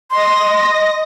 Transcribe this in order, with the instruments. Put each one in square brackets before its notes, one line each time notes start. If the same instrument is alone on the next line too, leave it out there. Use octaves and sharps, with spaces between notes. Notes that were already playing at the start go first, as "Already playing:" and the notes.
[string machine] D#5 A#6 [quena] C6